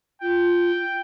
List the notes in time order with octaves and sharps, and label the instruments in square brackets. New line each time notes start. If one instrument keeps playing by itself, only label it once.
[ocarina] F4 [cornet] G5